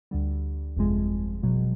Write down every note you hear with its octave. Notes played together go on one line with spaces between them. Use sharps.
D2 D3 G3
G1 F2 C3 F3 G#3
E2 B2 F#3